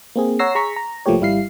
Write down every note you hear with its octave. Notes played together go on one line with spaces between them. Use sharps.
A#3 C4 G#4
C#5 F#5 A#5 E6 A#6 C7
G#4 A#5 C#6 B6
A#5
C2 F3 A3 A#3 G4 C#5
G#1 G3 E4 F5 C7